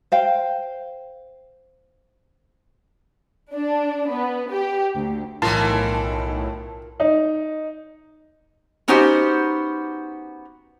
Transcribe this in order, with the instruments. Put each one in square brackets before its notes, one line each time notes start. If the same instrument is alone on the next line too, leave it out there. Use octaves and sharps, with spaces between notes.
[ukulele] C5 F5 G5
[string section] D4
B3
G4
D2
[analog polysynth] B1 A2 [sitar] D#3 E3 [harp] F4 A#4 [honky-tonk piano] A5
[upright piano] D#4
[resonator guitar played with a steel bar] B3 C#4 D#4 F#4 G4 C5